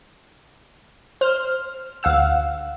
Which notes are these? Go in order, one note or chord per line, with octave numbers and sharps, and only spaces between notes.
C5 F6
D2 F5 F#5 E6